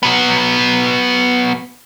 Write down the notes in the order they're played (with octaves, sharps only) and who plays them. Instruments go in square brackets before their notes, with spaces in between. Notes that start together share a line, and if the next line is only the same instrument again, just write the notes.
[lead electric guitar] F#3 B3